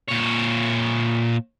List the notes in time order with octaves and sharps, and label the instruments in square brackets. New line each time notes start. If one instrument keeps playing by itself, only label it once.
[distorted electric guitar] A#2 C#5